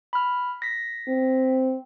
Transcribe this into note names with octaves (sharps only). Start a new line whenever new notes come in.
B5 F6
A#6 B6
C4